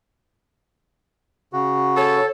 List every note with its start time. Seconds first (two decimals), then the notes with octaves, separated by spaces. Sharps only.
1.53 C#3 F#4
1.97 A4 C#5